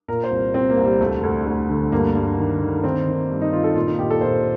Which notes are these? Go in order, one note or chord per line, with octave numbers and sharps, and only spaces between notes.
A#2 A#4
C5
C2
C2 C4
A#3
C2
G3
D2 A3
D2
D2
D3
G2 A#3
G2
D#3
D#3
D#3 C4
D#3
G2
D#4
D#3 F4
A4
A#2 F4
D#4
A#2 G4
A4
A#2 C5